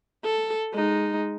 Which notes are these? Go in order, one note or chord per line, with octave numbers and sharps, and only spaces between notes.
A4
G#3 D#4